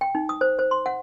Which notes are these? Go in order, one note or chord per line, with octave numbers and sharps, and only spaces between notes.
G5
D#4
D#6
C5
C5
C6
F#5